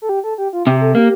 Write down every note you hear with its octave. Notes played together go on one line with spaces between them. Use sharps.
A4
G4
A4
G4
F4
C3 G4
A4
A#3 G4